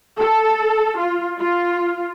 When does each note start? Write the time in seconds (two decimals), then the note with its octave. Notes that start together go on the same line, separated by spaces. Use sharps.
0.18 A4
0.97 F4
1.40 F4